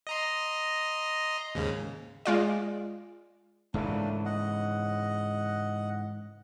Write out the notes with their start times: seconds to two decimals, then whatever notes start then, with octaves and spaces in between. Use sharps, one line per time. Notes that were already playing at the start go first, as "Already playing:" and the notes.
0.07 D#5 A#5 C6
1.55 D#2 G#2 C#3
2.26 G#3 F4 D5
3.74 G#2 C#3 E3 A3 A#3 D4
4.25 D#5 F#5